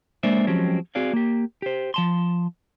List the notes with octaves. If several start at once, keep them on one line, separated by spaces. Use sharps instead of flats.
G#3 A#3 D4 C5 D5 E5
F3 F#3 G#3 C4 C#4 G4
C4 F#4 G#4 D5 F5
A#3 G4
G4 C5
F3 A5 C6